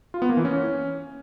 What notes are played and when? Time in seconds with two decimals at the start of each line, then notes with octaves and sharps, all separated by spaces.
0.14 F4
0.22 B3
0.29 A#3
0.37 E3
0.45 C#4